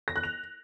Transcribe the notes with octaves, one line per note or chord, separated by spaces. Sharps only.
A#6
F#6
F7